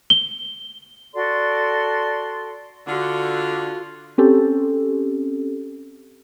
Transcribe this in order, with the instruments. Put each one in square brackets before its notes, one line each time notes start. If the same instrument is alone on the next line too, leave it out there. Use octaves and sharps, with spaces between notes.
[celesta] G7
[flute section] F#4 A4 D5 C6
[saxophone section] D3 [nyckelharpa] F4 F#4
[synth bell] C4 C#4 G4 A4